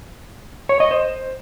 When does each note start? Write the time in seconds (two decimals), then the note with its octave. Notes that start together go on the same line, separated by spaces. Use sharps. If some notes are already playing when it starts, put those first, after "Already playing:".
0.69 C#5
0.80 D#5
0.91 C5